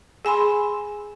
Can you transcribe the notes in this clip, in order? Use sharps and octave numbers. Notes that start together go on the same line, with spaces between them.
G#4 G#5 B5 C6